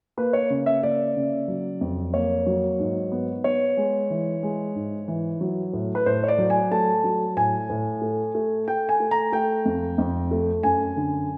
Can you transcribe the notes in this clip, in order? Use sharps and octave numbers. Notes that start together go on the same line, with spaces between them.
A#3 B4
C#5
C#3
E5
A#3 D5
C#3
F#3
F2
A#3 C#5
F#3
G#2
B3
B3 C#5
G#3
E3
G#3
G#2
E3
F#3
A2
B4
A2 C5
C#5
D5
F#3
G#5
A3 A5
F#3
A2 G#5
A2
A3
A3
A3 G5
G#5
A3
A#5
A3 G5
F2
F2
A3
F#2 G#5
D3